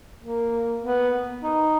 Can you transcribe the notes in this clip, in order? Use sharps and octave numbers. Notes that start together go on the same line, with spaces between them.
A#3
B3
D#4